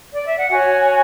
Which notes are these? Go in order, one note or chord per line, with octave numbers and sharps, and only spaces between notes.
D5
E5
F#5
F#4 C#5 G#5